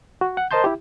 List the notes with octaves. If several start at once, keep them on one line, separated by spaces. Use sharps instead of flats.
F#4
F#5
A#4 C5 D#5 A5 C6 G6
E4 G4